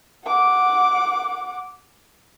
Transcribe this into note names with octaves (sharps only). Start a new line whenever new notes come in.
F#5 D6